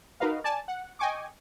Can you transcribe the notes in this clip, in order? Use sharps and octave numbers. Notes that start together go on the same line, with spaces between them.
D#4 F#4 A#4 B4 D#5 F5
D5 G#5 A5
F#5
D#5 G5 G#5 C#6 D6